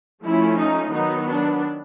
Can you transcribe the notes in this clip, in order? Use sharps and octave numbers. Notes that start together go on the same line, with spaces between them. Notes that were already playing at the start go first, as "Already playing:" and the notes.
F3 A3 C#4 E4
D#4
D#3 F#3 B3 D#4
D4